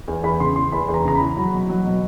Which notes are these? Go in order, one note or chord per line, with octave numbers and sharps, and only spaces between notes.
E2
E2 B5
C#3 C6
E3 C6
E2 B5
E2
A#5
C#3 A#5
B5
E3
F#3 B5
B2
F#3
B2